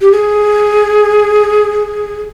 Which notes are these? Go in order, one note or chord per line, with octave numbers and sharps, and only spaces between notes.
G4
G#4